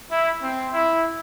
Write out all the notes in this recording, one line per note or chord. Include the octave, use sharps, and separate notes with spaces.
E4
C4
E4